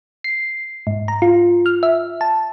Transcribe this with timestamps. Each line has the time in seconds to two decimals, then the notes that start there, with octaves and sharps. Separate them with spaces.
0.24 C7
0.87 G#2
1.08 A#5
1.22 F4
1.66 F6
1.83 E5
2.21 A5